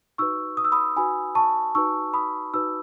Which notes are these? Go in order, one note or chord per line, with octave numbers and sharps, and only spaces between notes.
D#4 F#4 B4 C#6 E6
D#6
E6
B5 D#6
D#4 F#4 B4 G#5 B5
A5 C#6
D#4 F#4 B4 C#6 E6
B5 D#6
D#4 F#4 B4 E6